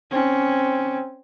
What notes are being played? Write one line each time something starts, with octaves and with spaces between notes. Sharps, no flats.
C4 C#4